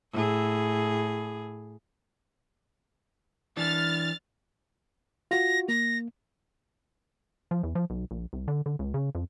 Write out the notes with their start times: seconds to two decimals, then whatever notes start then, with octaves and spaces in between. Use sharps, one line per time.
0.12 A2 G#4
3.57 E3 D4 F6 A6
5.31 F4 F#4 A#6
5.69 A#3 A#6
7.51 F3
7.63 E2
7.75 F3
7.90 B1
8.11 A#1
8.33 C2
8.48 D3
8.66 D3
8.79 C#2
8.94 C#3
9.15 F2